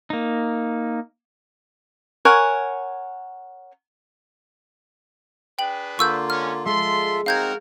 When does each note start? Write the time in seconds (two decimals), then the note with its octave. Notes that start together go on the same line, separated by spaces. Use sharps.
0.10 A#3 D#4
2.25 A#4 C#5 F#5 G#5
5.59 D4 G#4 B4 G5 F#7
5.99 D3 A#3 F4 C#6 E6 G6
6.30 G#3 C#4 F6
6.65 G#3 F4 A4 E5 C6
7.26 C4 D#4 F#4 A#4 F5 G6 G#6